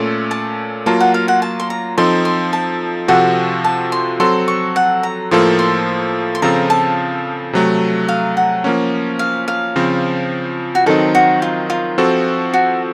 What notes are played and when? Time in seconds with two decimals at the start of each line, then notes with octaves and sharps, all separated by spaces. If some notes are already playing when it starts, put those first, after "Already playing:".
Already playing: A#2 A3 C#4 A4 C6
0.31 A5
0.86 F#3 A#3 F4 A5
1.00 F#5
1.14 F5
1.28 F#5
1.42 A5
1.60 C6
1.70 A#5
1.98 F3 C4 D#4 A4 C6
2.25 C6
2.53 A5
3.08 C3 F3 C4 F#4 A4 F#5
3.64 A5
3.92 C6
4.20 F#3 C4 F#4 A4 C6
4.48 C#6
4.76 F#5
5.03 A#5
5.31 A2 F3 A#3 F4 A4 C6
5.59 C6
6.35 C6
6.42 C#3 F3 C4 F4 A4 A#5
6.70 A5
7.53 C3 F#3 A3
8.08 F5
8.37 F#5
8.64 F3 A#3 C#4
9.19 F5
9.48 F5
9.76 C#3 F3 C4
10.75 F#4
10.86 D#3 F#3 C4 D#4 A4
11.15 F#4
11.42 F4
11.70 F4
11.98 F3 C4 F#4 A4
12.54 F#4